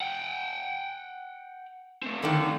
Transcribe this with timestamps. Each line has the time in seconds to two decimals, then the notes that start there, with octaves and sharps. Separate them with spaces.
0.01 F#5 G5
2.03 A3 C4
2.22 F#2 D3 D#3